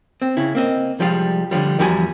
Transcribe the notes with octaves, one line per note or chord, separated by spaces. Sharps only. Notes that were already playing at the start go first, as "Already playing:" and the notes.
C4
C#3 E4
A#3 C4 D#5
C2 F3 G3 G#3 D5 F5
D3 E3 F3 G3
E2 F3 G3 F#4 B4 G#5